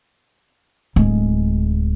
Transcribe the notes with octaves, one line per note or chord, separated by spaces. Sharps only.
D1 G#3